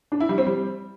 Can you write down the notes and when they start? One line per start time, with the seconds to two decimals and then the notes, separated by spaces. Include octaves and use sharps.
0.12 D4
0.20 E4
0.29 G3
0.38 C4
0.47 G3